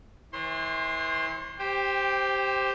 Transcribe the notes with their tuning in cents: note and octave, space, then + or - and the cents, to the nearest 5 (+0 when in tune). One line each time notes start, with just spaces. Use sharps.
E3 -30 C5 +45 C6 +0
G4 +0 C5 +0 G5 +25